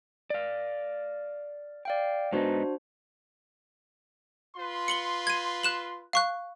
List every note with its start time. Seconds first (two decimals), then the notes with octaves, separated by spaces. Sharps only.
0.30 D5 F5
1.85 D5 F5 G5
2.32 G#2 B3 D4 D#4 F#4 C5
4.56 F4 B4 C6
4.88 C#7 F#7 G7
5.27 G#6 D#7
5.63 F#6 E7 F#7
6.13 F5 C#6 F#6